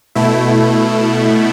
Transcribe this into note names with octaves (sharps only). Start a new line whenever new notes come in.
B2 A3 E4